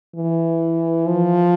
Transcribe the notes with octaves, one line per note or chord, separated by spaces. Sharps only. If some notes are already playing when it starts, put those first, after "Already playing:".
E3
F3